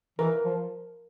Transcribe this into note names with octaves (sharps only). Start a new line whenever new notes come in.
E3 A#4
F3